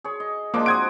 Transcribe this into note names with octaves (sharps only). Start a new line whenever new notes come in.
G#4 C#5
D#5
F3 G#3 A#3 D4 D6
C4 F#4 F#5 D#6 G#6 D7